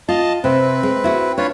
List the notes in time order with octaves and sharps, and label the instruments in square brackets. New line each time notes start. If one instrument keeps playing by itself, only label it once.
[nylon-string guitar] F4 [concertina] D#5 A5
[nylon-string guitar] C3 [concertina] C4 B4
[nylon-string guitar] G#3
E4 F#4
[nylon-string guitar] D4 [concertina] F4 B4 C#5